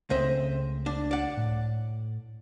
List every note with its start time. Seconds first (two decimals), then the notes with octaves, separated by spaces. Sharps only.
0.10 C#2 C#3 A3 C4 D#5 E5
0.86 D4
1.11 D5 F#5
1.37 A2